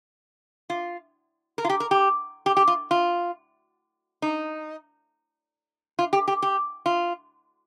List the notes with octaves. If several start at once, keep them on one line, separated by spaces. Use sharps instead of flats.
F4
A#4
F4
G4
A#4
G4
G4
G4
F4
F4
D#4
F4
G4
G4
G4
F4